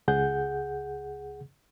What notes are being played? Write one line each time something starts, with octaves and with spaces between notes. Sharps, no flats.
C#2 G#4 F#5 G6